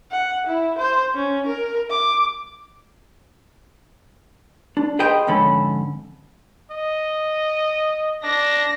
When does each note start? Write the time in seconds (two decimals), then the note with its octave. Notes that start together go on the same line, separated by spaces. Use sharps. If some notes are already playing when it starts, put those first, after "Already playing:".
0.11 F#5
0.47 E4
0.78 C5
1.14 C#4
1.46 A#4
1.90 D6
4.77 D4
4.99 G#4 B4 C5 D#5 G5
5.27 F2 G#2 D3 C#4 A4 B5
6.71 D#5
8.23 D4 A#6